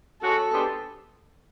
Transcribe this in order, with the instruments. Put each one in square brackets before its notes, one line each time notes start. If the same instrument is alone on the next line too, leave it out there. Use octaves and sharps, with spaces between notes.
[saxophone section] G#3 C#4 F#4 [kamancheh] A4
[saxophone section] G#3 B3 D4 G4 C5